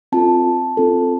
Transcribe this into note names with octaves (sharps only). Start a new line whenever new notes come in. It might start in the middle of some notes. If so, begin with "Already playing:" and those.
C4 F4 A4 A5
C4 F4 A4